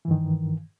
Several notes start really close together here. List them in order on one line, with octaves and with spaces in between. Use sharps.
E3 G2 D#3